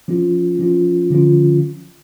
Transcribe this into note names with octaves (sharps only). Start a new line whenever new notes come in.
F3 C#4 F4
F3 C#4 F4
D3 F3 C#4 F4